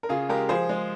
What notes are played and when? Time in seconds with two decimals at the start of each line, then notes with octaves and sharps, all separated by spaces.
0.03 A#4
0.09 C#3 F4 G#4
0.29 G#3 G4 A#4
0.49 F3 G#4 C5
0.69 G#3